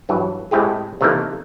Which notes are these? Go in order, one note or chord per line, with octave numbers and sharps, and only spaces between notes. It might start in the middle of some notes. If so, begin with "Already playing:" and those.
G2 E3 F#3
A2 G#3 C4 E4 G4 G#4
C3 D#3 E3 A3 A#3